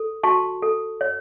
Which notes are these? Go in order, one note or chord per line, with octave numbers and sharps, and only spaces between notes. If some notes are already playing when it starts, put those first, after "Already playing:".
Already playing: A4
F#4 A5 C#6
A4
C#5